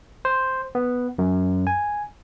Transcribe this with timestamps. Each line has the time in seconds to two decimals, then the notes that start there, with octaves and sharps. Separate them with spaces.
0.25 C5
0.75 B3
1.18 F#2
1.67 G#5